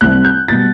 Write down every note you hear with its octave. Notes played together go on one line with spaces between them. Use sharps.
C2 C3 G3 F#6
G6
B2 G3 A6